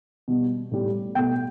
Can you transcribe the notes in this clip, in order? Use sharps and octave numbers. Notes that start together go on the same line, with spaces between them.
B2 G3
A2 G3
B2 A3 G5